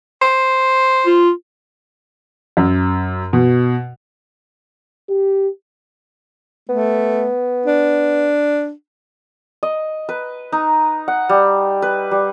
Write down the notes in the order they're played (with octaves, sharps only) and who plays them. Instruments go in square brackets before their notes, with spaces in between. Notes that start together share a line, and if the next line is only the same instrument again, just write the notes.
[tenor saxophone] C5
[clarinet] F4
[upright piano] F#2
B2
[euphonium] G4
[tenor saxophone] A3 [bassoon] B3
[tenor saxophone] D4
[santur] D#5
B4
D#4
F#5
G3
B4
G3